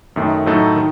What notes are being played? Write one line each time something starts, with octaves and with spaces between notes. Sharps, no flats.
F#2 D#3 A3
A2 F#3 A3 D#4 A4
D#3